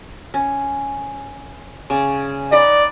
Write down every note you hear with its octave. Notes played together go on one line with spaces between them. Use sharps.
C#4
C#3 C#5 D5
D#4 D5 F#5 B5